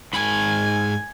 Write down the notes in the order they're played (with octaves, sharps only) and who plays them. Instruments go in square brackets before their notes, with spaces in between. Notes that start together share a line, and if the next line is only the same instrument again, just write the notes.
[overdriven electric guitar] G#2 B5 [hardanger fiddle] G#5